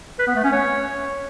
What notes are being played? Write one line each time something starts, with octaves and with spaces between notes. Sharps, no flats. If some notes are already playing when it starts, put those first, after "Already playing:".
B4
B3
A3
C#4
C#5